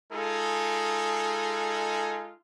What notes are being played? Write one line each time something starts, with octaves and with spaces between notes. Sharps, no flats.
G#3 D#4 F4 G#4 A4